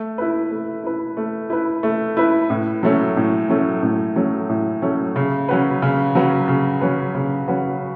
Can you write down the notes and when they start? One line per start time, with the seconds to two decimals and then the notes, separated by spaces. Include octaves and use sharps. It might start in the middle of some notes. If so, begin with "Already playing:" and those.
Already playing: A3
0.18 E4 B4
0.51 A3
0.84 E4 B4
1.17 A3
1.50 E4 B4
1.83 A3
2.17 E4 B4
2.50 A2
2.83 F#3 A3 C#4
3.17 A2
3.49 F#3 A3 C#4
3.83 A2
4.16 F#3 A3 C#4
4.49 A2
4.82 F#3 A3 C#4
5.16 C#3
5.49 F#3 C#4 F#4 B4
5.82 C#3
6.15 F#3 C#4 F#4 B4
6.48 C#3
6.81 F#3 C#4 F#4 B4
7.15 C#3
7.48 F#3 C#4 F#4 B4